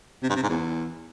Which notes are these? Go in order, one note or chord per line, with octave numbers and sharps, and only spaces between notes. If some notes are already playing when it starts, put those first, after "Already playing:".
C3
G2
C3
G#2
E2